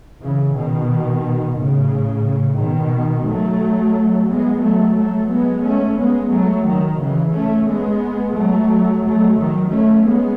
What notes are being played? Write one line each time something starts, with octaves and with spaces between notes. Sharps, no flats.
C#3 E3
B2 D#3
A2 C#3
B2 D#3
F#3 A3
G#3 B3
F#3 A3
F#3 A3
G#3 B3
A3 C#4
G#3 B3
F#3 A3
D#3 F#3
C#3 E3
A3 C#4
G#3 B3
F#3 A3
F#3 A3
D#3 F#3
A3 C#4
G#3 B3